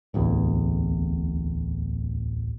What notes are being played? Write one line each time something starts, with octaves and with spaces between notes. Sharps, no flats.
D1 A1 E2